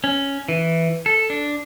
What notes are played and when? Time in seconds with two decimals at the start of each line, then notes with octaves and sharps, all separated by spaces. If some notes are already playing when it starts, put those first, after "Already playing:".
0.04 C#4
0.49 E3
1.06 A4
1.30 D4